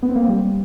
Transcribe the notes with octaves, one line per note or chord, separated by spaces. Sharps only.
B3
C4
A#3
C4
G3